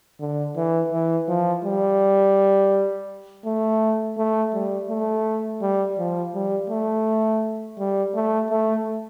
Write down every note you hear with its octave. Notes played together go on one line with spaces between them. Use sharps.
D3
E3
E3
F3
G3
A3
A3
G3
A3
G3
F3
G3
A3
G3
A3
A3